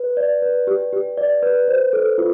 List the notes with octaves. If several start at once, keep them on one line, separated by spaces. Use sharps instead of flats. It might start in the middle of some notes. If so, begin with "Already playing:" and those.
Already playing: B4
D5
B4
G4
G4
D5
B4
C5
A4
F4